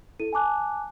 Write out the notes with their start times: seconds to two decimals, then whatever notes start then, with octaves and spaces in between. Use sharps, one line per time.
0.20 E4 A4 D#7
0.33 G#5 A5 D6 F#6